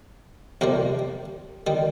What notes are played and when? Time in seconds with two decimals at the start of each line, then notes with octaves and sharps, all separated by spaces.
0.61 F2 C3 G3 A#4
1.67 D#3 G3